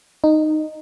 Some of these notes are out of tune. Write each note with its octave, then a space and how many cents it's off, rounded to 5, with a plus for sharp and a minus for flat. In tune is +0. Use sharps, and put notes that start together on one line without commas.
D#4 -10